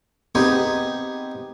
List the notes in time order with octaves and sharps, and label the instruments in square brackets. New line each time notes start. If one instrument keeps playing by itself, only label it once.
[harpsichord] B3 C4 D#4 G4 G#4